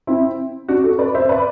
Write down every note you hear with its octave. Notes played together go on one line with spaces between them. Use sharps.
C4 E4
D4 F#4
F#4 A4
B4 D5
C5 E5
B4 D5